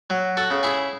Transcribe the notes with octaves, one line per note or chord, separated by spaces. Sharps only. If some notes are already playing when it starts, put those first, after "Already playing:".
F#3
F#4 A4
C#3
E4 G#4